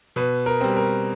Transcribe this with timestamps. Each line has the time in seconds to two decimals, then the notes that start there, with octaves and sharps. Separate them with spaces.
0.16 B2 B4
0.46 A#4
0.61 G3 C4
0.77 A#4